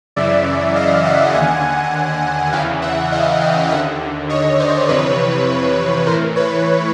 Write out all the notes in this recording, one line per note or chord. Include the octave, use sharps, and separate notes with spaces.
F#2 C#3 E3 D5 E5
D#5 F5
E5 F#5
D#2 D3 F#5 G#5
E2 C#3 E3 F5 G5
E5 F#5
D#5 F5
F5 G5
D#2 D3 E5 F#5
C#5 D#5
C5 D5
F2 C3 E3 B4 C#5
A2 E3 A#4 C5
B4 C#5